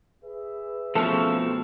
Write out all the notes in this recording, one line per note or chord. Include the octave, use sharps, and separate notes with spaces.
G#4 B4 E5
B2 F3 A3 C4 C#4 F4 A4